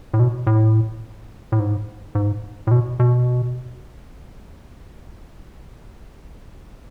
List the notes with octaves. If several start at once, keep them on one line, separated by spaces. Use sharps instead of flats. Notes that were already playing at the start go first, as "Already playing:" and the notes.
A2
B2
A2
A2
G#2
G#2
A2
B2
B2